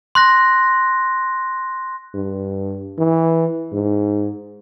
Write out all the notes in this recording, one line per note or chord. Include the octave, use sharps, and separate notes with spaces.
C6 F#6 A#6
G2
E3
G#2